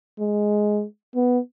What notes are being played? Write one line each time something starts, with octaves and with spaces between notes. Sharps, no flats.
G#3
B3